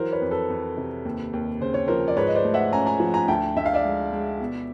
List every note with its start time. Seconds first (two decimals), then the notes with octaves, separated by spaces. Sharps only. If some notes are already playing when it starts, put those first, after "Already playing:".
Already playing: E3 F#3 A#4 C5
0.12 B4 C#5
0.22 F2
0.31 A4 B4
0.50 F2
0.77 C3
1.05 D#2
1.33 D#2
1.60 C#3 C5
1.74 C#5
1.87 F3 A#4 C5
2.08 D5
2.16 G#2 B4 C#5
2.27 D#5
2.35 C5 D5
2.44 A3
2.54 E5 F#5
2.73 C#4 G#5 A#5
2.86 G#5 A#5
3.00 F3
3.14 G#5 A#5
3.28 D2 G5 A5
3.56 D2 E5
3.66 F5
3.74 D5 E5
3.84 G#3
4.13 G#3
4.40 B2